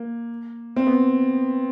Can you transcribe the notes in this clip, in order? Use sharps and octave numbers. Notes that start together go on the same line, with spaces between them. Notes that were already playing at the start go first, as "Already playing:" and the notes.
Already playing: A#3
C4
B3